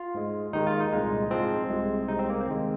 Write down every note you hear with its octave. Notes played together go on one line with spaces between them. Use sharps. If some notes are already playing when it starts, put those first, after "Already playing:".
Already playing: F4
G#2 G#3
D#2 D#3 G#3 D#4
F4
D#4
C2 A#2 G#3
G#2 F3 G#3 C4
C2 C3 G#3
C2 C3 G#3 D#4
C4
A#3
C4
D#2 D#3 G#3